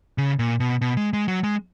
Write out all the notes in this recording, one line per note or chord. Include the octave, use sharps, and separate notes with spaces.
C#3
A#2
B2
B2
G#3
G#3
F#3
G#3